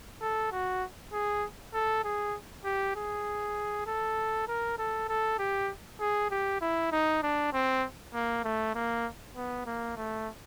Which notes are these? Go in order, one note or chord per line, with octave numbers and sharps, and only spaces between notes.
A4
F#4
G#4
A4
G#4
G4
G#4
A4
A#4
A4
A4
G4
G#4
G4
E4
D#4
D4
C4
A#3
A3
A#3
B3
A#3
A3